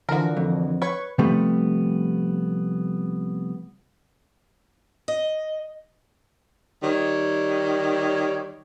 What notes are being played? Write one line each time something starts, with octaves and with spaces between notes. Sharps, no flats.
D3 E3 F3 F#4 A#4
F2
B4 C#5 C#6
C3 F3 G3 A3 B3
D#5
D#3 G3 C#5